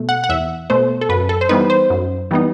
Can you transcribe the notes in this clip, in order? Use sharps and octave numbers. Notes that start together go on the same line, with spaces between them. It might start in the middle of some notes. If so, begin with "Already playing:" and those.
Already playing: B2 A3
F#5
F#5
E2 E5
B2 A3 C5
A4
F#2 B4
A4
C5
E3 G3 B3 D#4 B4
C5
F#2
E3 G3 B3 D#4